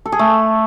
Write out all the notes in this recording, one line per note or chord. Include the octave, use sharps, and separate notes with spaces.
A4
G#4
A3